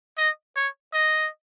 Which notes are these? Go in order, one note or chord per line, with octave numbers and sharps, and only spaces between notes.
D#5
C#5
D#5